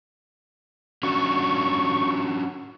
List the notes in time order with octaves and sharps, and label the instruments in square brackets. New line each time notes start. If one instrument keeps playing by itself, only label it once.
[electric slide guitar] C#4 D4 F#4 [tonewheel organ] C#6